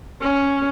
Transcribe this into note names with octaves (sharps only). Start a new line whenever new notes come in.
C#4